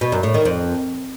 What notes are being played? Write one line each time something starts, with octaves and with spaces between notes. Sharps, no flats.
B2
F#2
A2
D#3
F2